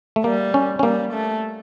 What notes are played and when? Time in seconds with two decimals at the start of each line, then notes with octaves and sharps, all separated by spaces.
0.16 A3
0.24 G3 A#3
0.54 C#4
0.79 C#4
0.83 G3 A#3
1.13 A3